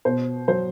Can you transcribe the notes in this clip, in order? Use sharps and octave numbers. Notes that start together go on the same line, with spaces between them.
B2 C5
F#3 C5